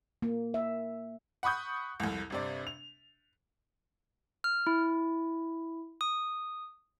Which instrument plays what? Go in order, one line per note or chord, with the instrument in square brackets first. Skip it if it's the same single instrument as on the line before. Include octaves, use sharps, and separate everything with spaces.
[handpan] A#3
E5
[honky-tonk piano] F#5 B5 C#6 D#6 G6
C2 F2
G1 C3 D5
F7
[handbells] F6
E4
D#6